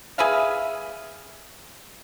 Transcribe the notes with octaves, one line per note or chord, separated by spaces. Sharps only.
G#4 B4 E5 F5